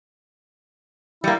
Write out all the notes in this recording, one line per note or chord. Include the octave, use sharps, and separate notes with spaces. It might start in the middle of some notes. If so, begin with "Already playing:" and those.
G3 A#3 E4